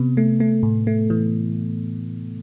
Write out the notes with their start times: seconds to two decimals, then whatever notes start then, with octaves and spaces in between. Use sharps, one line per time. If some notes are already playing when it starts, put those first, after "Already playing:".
Already playing: C3 B3
0.17 A3
0.40 A3
0.63 A2
0.87 A3
1.10 E3